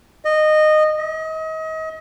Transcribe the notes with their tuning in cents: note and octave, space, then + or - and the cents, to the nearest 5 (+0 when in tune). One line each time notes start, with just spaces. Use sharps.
D#5 -15
D#5 +35